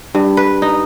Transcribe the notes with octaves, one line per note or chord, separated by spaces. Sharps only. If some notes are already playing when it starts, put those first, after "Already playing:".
G2
B4
D#4